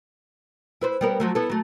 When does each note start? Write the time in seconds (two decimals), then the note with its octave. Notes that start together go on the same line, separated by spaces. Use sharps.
0.81 E4 B4 C5
1.01 G3 B3 A#4
1.20 F3 F#3 A3
1.35 B3 E4 A4
1.50 F#3 A3